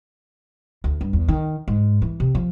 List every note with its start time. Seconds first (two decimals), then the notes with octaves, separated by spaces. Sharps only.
0.84 D2
1.01 G2
1.13 E2
1.28 D#3
1.68 G#2
2.02 E3
2.20 C3
2.35 F3